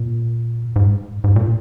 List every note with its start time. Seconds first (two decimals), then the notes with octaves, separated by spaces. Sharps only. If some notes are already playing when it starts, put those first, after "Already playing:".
Already playing: A#2
0.76 G#2
1.24 G#2
1.36 A#2